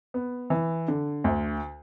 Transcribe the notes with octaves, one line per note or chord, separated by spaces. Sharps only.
B3
E3
D3
D2